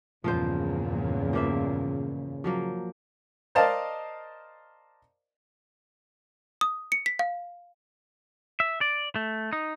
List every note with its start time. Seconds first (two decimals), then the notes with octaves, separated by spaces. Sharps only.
0.24 E2 G2 A#2 C#3 F3 F4 C5
1.33 F3 A#3 E5
2.44 F3 F#3 A#3
3.55 A#4 C5 D5 D#5 F5 A5
6.61 D#6
6.92 C#7
7.06 B6
7.19 F5
8.60 E5
8.81 D5
9.16 A3
9.53 D#4